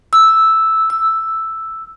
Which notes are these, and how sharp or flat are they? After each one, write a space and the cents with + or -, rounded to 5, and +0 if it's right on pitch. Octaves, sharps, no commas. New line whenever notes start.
E6 -5
E6 +0